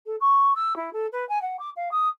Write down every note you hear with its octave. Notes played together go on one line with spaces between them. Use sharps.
A4
C#6
E6
E4
A4
B4
G#5
F#5
D6
F5
D#6